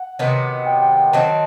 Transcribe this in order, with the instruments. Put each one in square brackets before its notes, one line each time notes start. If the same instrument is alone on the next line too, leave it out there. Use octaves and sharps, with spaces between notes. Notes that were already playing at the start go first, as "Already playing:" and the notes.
Already playing: [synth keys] F#5
[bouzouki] C3 D#3 F#3 B3
[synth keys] G5
G5
G5
[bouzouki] D#3 F#3 C4 [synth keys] A5